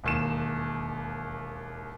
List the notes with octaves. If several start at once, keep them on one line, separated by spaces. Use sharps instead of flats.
E1 D#2 E7